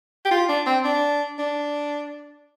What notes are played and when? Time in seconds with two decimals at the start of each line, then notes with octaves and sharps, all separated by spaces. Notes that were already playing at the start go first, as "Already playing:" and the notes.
0.25 G4
0.31 F4
0.49 D4
0.66 C4
0.84 D4
1.38 D4